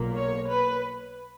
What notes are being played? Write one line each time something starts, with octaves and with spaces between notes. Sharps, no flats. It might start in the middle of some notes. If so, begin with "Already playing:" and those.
Already playing: B1 A#2 A#3
C#5
B4